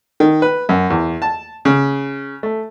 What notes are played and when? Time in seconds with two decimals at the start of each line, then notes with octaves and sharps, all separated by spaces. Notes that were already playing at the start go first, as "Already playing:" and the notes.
0.20 D#3
0.42 B4
0.69 F#2
0.90 E2
1.22 A5
1.65 C#3
2.43 A3